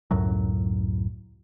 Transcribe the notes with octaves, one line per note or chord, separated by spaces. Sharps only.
C#2 F#2 A2 F#3